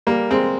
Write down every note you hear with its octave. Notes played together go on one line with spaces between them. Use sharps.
G3 A#3
G#3 C4